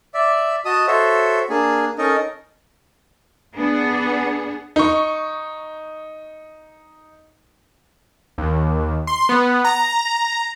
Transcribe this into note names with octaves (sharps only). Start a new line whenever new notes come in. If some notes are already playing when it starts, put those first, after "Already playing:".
D5 E5
F#4 D#5 A5 D#6
F#4 A4 C5 C#5 E5
A#3 D4 G#4
C#4 D#4 A4 A#4 D#5
B3 D4 G#4
D#4 C#6
D#2
C6
B3
A#5